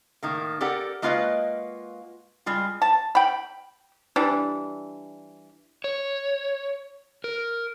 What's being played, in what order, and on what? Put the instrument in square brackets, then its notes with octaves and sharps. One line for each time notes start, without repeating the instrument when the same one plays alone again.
[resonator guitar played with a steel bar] A2 D#3 A#3
G4 A4 A#4 D5 F#5
G#3 A#3 F4 F#4 B4 D#5
G3 G#3 F4
[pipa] A5
G5 B5
E3 G3 D4
[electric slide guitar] C#5
A#4